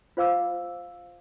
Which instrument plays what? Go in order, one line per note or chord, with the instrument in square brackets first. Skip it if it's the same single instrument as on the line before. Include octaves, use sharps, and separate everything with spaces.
[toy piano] F4 C5 F5 D6 E6